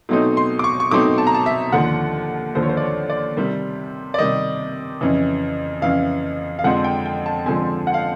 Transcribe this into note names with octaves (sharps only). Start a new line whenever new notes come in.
B2 F#3 A3 C4 D#4
C6
D6
C#6
C#6
B2 F#3 A3 C4 D#4 D6
A5
A#5
A5
E5
D#2 D3 F3 F#5
D#2 D3 F3 C5
C#5
C5
D5
C#5
D5
C3 D#3 G3
D5
C3 D#3 G3 D#5
F2 C#3 E3
F2 C#3 E3 F5
F5
F2 D3 F3 G#3 C4 F#5
G5
G5
A5
F2 D3 F3 G#3 C4 G#5
F#5
F5